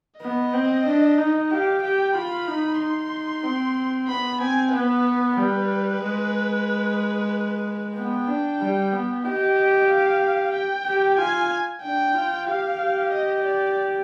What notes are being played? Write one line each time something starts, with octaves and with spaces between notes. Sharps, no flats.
B3 D#5
C4
D4
D#4
G4 F5
G4 G5
F4 B5
D#4
D#4 C6
C4
B3 B5
C4 G#5
B3 B4
G3 B4
G#3
B3 G5
D4
G3
B3
G4 D#5
F5
G5
G4
F4 G#5
D4 G5
F4
G4 F5
G4
D#5
D5